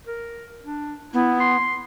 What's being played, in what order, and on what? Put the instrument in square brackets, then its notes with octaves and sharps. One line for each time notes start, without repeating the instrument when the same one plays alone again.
[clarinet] A#4
D4
[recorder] B3 [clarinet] E4
[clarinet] C6